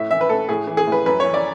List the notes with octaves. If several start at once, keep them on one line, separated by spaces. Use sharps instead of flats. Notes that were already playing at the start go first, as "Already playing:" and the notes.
Already playing: A2 E5
E3 E5
B4
A2 A4
A2 G#4
E3
G#4
A2
B4
F#2 B4
E3 C#5
D5